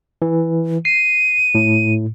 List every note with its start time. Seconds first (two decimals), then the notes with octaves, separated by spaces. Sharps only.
0.22 E3
0.85 C7 D#7
1.55 A2